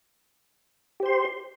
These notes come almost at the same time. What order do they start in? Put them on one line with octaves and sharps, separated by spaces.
G4 C5 C6